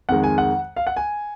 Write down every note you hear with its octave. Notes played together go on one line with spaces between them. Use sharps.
F2 D#3 G#3 F#5
G#5
F#5
F5
F#5
G#5